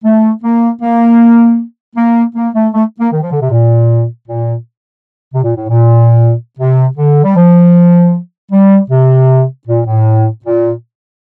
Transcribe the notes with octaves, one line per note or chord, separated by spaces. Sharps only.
A3
A#3
A#3
A#3
A#3
A3
A3
A#3
D#3
F3
D3
C3
A#2
A#2
C3
A#2
A2
A#2
C3
D3
G3
F3
G3
C3
A#2
A2
A#2